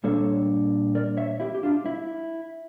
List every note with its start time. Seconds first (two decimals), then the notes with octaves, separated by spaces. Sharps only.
0.04 A#2 G3 A#3 D4 A4 C#5
0.95 A#4 D5
1.17 C#5 E5
1.40 E4 G4
1.55 G4
1.63 D4 F4
1.86 E4